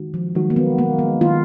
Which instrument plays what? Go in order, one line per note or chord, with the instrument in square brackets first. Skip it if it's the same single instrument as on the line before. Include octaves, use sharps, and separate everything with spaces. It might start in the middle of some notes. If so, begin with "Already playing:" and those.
Already playing: [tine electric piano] D#3 G#3 D#4 F#4
[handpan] F3
[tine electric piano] D#3 G#3 D#4 F#4 [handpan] F#3
[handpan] A#3
B3
A#3
G#3
[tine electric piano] D#3 A#3 [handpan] F4